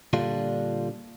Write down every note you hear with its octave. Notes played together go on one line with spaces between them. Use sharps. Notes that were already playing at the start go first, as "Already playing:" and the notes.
A#2 D3 G3 D4 F4